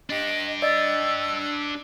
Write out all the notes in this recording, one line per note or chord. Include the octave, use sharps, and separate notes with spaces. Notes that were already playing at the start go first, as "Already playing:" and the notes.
D4 G4 D#5
D5 D#5 E6 A6